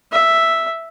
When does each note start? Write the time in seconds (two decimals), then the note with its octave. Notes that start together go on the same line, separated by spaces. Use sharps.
0.12 E5